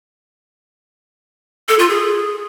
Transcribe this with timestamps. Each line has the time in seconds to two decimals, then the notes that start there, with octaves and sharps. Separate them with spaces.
1.69 A4
1.79 F4
1.90 G#4